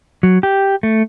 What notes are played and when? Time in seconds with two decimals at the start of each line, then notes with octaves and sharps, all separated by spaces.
0.23 F#3
0.43 G4
0.83 A3